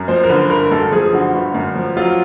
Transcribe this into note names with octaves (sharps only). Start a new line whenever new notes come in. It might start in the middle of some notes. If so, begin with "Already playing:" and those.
Already playing: F#2
F3 C5
A#4
D3 B4
G1 A#4
F#2 A4
F3 G#4
D3 F#4
G1 F#4
F#2
F3
F#3 F4